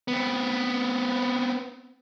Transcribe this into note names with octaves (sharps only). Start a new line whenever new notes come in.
B3 C4